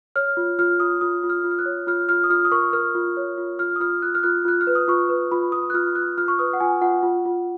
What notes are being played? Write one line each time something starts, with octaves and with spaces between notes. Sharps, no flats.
C#5 F6
F4
F4 F6
F4 D#6
F4 D#6
F4
F6
F4
F6
F#6
C#5
F4 F6
F4 F6
D#6
F4 F6
D#6
A#4 C#6
A#4 F6
F4
C#5
F4
F4 F6
D#6
F4 F6
F4 F#6
F6
F4 F#6
F4 F#6
F6
B4
D#6
F4 C#6
B4
F4 B5
F4 D#6
F#6
F4 F6
F4 F#6
F4 F6
C#6
B4 D#6
F#5
F4 G#5
F4 F#5
F4
F4